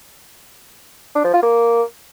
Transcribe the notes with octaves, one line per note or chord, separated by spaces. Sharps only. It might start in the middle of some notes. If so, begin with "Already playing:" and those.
D4
F3
F4
A#3